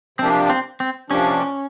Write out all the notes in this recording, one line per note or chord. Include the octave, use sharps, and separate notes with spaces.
C3 F3 A#3 C4 D4 G4
C4
C4
C3 F3 A#3 C#4 D4 G4